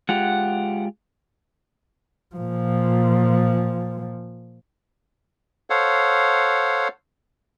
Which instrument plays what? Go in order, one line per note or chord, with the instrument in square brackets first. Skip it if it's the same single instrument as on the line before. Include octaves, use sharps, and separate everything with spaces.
[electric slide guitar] G#3 F4 G4 [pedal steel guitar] F#5
[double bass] A#2 F3
[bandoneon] A4 C5 C#5 F5 F#5